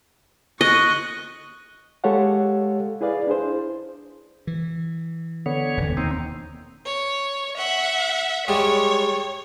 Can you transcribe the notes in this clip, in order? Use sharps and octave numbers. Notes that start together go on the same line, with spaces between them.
D#5 C#6 F#6
G#3 G4 A4 C#5 F5 F#5
E4 G#4 B4 D5 F5
D4 E4 G#4 C5
E3
D3 B3 C#5
E1 D#2
D#2 C4 D#4
C#5
E5 F#5
G3 G#3 C#5 D5